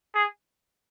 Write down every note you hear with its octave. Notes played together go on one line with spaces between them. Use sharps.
G#4